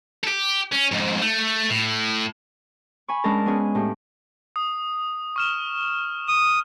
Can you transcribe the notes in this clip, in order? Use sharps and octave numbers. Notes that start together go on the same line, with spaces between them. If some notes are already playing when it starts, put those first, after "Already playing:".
G4 A4
C#4
F2 G#2
A3
A2
G#5 B5 C#6
G#3 C#4 D4 A#4 A5
B3 C#4 G#4
A2 G4
D#6
C#6 F6 E7
D#6